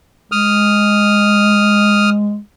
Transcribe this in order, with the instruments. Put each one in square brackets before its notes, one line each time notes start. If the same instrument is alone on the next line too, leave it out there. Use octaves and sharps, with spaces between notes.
[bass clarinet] G#3 [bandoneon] D#6 F6